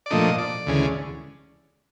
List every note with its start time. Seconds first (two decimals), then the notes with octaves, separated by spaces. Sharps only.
0.06 D5
0.11 A#2 F3 A3 D4 D#5
0.38 D5
0.67 D2 C#3 E3 G#3 C#4